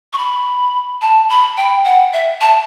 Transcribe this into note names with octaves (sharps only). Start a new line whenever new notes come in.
C#6
B5
A5
B5
G5
F#5
E5
A5